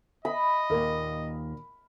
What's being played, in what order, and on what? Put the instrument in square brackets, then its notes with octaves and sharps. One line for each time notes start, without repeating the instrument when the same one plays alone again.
[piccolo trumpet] D#5 [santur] B5
[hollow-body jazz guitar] D#2 A#2 [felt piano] A#4